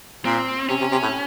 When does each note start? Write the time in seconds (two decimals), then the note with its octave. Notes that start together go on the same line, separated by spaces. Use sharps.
0.25 A#2 C4
0.69 C3 C#4
0.81 C3
0.92 C3
1.03 A2